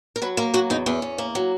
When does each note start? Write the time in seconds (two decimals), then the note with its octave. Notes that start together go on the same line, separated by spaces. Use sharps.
0.16 A#4
0.22 F#3 B4
0.37 A#3 A#4
0.54 F#3 F#4
0.70 E2 D#4
0.86 E2 C#4
1.02 E2
1.18 A#3
1.35 F#3